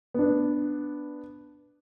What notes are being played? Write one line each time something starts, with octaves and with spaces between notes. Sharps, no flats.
B3 D4